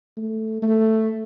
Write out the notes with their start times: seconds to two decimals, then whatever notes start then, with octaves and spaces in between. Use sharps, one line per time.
0.17 A3
0.62 A3